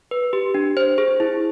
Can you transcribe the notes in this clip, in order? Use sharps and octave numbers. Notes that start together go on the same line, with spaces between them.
B4
G4
D4
C5
G#4
E4